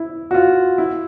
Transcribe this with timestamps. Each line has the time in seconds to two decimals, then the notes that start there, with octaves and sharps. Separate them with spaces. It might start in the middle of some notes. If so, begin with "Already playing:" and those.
Already playing: E4
0.31 F#4
0.34 F4
0.78 E4